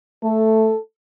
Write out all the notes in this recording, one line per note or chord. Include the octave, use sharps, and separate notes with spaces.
A3 A4